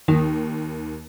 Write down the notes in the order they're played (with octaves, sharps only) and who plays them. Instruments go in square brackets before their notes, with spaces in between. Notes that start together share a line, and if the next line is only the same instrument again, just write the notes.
[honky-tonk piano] D#2 [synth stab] D#3